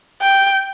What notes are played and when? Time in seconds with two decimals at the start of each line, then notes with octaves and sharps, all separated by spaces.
0.22 G5